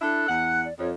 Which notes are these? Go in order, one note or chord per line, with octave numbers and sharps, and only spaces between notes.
D4 E4 A4 F#6
E2 F#5
D5
F2 C#5